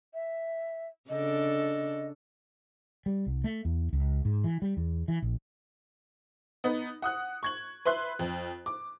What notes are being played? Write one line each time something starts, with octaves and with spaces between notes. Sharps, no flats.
E5
C#3 D4 A4 D#5
G3
C2
A3
E2
C#2
G#2
E3
G3
E2
E3
A#1
B3 D#4
F#5 D#6 F#6
C#6 G#6 F#7
B4 E5 C6 F#6
F2
D6